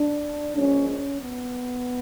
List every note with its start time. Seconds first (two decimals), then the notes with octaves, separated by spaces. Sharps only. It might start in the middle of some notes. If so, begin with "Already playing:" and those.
Already playing: D4
0.54 A#1 A#2 F3 G#3 C#4
0.88 C#4
1.21 B3